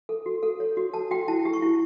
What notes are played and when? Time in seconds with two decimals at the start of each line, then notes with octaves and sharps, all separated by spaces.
0.09 A4
0.26 F#4
0.43 A4
0.60 C#5
0.77 F#4
0.94 A4 A5
1.11 F#4 G5
1.28 E4 A5
1.45 G4
1.53 C#6
1.62 E4